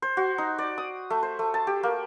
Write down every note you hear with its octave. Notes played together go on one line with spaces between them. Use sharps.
C5
F#4
D#4
D5
D#6
A3
C5
A3
A5
G4
A#3